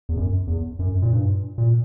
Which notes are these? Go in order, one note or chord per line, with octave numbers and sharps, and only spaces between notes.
E2
F#2
E2
F#2
A#2
G2
A#2